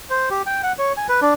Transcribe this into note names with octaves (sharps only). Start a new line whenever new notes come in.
C5
G4
G5
F#5
C#5
G#5
B4
D4